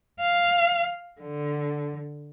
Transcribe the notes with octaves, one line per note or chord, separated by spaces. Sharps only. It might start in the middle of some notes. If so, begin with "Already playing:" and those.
F5
D3